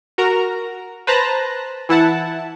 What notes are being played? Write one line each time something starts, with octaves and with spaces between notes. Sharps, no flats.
F#4 A#4 A#5
B4 C5 A5 A#5 F#6 A#6
E3 E4 F#5 A5